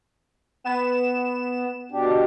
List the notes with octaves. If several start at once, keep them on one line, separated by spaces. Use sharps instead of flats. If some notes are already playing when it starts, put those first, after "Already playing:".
B3 E7
B2 D4 G4